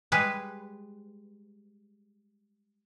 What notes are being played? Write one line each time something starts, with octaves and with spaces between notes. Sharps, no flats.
G3 G#3 G#4 B4